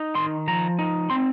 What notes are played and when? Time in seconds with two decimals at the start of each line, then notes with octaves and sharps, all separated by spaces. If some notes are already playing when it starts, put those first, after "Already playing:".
Already playing: D#4
0.15 D#3 C6
0.48 F3 A#5
0.79 D#4
1.10 C4 C6